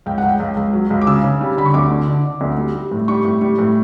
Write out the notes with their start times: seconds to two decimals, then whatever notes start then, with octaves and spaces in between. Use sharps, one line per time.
0.06 C#2 G5
0.18 F#5
0.23 C#2
0.29 G5
0.40 C#2
0.57 C#2
0.73 F#3
0.90 C#2
1.01 D6
1.07 C#3 E6
1.24 C#3
1.41 G3
1.57 D3 B5
1.66 C#6
1.74 D2 D6
1.91 D3
2.08 D3
2.24 D3
2.41 D2
2.58 G3
2.75 G3
2.91 A2
3.08 G3 C#6
3.25 A2
3.41 G3
3.59 A2